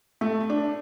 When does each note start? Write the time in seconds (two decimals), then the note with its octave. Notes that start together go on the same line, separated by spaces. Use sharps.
0.21 A3
0.50 D4